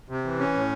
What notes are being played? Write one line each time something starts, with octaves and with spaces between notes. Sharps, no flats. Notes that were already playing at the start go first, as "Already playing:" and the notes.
C3
E3
C#4
A2